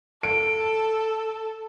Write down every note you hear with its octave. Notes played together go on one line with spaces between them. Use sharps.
A4 D7